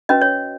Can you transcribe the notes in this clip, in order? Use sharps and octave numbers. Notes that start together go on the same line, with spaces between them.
C#4 F#4 B4 D#5
C#5